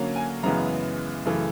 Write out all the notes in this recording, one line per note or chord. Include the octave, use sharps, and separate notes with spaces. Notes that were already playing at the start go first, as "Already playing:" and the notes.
Already playing: D3 F#3 A#3 C#4
G#5
F#2 C#3 E3 G#3 B3 A#5
F#2 C#3 E3 A3